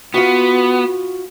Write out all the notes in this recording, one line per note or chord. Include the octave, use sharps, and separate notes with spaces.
B3 F4 F#4